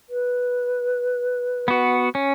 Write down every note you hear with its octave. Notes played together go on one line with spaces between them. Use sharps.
B4
B3 F#4
C#4